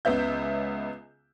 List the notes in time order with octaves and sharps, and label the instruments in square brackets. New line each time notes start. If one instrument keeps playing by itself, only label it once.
[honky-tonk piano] C#2 C#3 B3 E5 G6